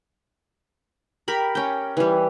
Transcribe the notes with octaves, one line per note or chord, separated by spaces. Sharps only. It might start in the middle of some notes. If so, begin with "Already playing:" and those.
G4 A#4 B5
C#4 G5
E3 G3